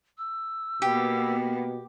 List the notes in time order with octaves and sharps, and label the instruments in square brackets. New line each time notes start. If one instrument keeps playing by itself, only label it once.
[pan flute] E6
[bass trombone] B2 [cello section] A#3 B3 [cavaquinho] G4